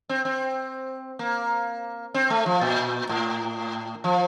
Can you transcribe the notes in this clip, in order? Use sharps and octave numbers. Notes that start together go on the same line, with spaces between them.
C4
C4
A#3
C4
A3
F3
A#2
A2
F3